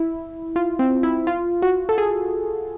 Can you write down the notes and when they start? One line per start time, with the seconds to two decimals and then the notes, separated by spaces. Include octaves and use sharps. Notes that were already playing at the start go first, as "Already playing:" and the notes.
Already playing: E4
0.56 F4
0.79 C4
1.03 E4
1.27 F4
1.62 F#4
1.89 A4
1.98 G#4